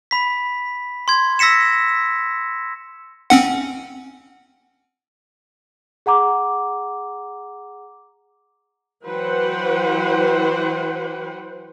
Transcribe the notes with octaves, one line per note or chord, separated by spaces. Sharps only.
B5 B6
C6 G#6
E6 A#6 B6 C#7 E7
C4 C#4 F#5
G#4 F#5 A#5 D6
E3 F#3 B4 C5 F#5 G5